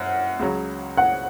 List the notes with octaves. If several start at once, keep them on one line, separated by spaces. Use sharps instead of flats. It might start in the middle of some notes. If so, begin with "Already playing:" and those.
Already playing: F#2 F#5
C#2 C#3 F#3
F#5